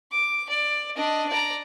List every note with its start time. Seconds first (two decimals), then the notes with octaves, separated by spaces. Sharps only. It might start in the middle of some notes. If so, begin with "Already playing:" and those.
0.12 D6
0.49 D5
0.97 D4 D#5
1.29 D5 A#5